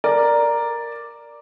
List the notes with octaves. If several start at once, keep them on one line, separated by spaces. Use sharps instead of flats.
A#4 D5